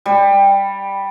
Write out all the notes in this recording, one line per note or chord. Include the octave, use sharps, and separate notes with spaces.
G3